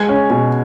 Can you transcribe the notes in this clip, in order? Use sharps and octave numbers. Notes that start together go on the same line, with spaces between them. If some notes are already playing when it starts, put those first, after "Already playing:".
Already playing: G#3 G#6
C#4
B2